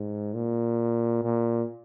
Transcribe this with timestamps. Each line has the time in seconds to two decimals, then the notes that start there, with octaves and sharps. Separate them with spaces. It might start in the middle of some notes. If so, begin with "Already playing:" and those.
Already playing: G#2
0.34 A#2
1.23 A#2